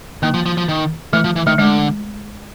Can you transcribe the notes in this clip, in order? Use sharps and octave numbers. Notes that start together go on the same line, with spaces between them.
D#3 A#3
F3
F3
F3
D#3
E3 A3
F3
E3
D#3 A3
D3 G#3